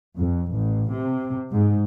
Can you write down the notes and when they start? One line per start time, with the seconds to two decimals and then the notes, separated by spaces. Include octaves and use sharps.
0.17 F2
0.52 A1
0.90 C3
1.50 G#2